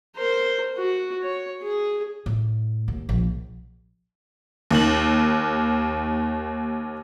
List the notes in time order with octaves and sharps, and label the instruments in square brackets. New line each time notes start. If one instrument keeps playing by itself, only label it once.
[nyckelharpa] A#4 C5
F#4
C#5
G#4
[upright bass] A2
D#2
A#1
[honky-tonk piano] D#2 D#3 F#7